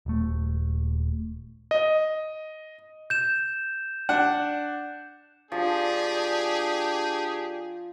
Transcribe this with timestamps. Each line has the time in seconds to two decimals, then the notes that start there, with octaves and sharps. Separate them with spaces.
0.06 D#1 A3
1.71 D#5
3.10 G6 E7
4.09 D4 F#5
5.52 F3 D4 G4 G#4